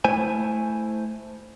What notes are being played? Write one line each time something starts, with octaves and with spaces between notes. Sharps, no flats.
A3 E4 C5 G#5